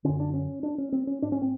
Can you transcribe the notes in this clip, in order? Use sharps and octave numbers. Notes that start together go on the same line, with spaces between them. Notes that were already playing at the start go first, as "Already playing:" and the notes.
F#2 D3 C#4
D4
C#4
D4
C#4
C4
C#4
G#2 D4
C#4
C4